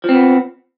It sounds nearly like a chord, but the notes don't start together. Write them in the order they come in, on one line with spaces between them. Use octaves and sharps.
F3 C4 B3